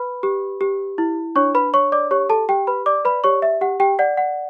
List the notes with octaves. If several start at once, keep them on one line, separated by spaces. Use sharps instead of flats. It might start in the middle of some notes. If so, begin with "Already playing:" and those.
Already playing: B4 B5
G4
G4
E4
D4 C#5 C#6
B4 B5
C#5 C#6
D5 D6
G4 C#5 C#6
A4 A5
G4 G5
B4 B5
D5 D6
B4 B5
G4 C#5 C#6
E5
G4 F#5
G4 G5
D5 F#5
F#5